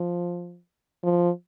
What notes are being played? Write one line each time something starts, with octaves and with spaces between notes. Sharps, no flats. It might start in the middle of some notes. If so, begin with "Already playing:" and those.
Already playing: F3
F3